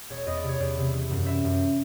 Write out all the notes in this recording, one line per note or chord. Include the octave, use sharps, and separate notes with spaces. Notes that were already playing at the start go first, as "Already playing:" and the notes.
E1 C#5
E2 D#5
D5
C3
C#5
E2 D5
C3
E3
F#2
E3 E5
F#2